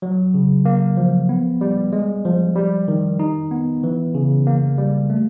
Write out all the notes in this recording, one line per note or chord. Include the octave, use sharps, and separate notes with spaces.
F#3
C#3
A#3
F3
B3
G3
G#3
F3
G3
D#3
D#4
B3
E3
C#3
A#3
G3
A3